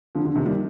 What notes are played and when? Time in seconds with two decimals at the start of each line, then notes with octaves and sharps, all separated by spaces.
0.15 D3 F3
0.25 D3
0.35 C3 D#3
0.46 D#3 G3